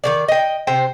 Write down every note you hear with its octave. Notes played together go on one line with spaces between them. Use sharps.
D#3 F#3 D5
D#5 G5
C3 C5 G5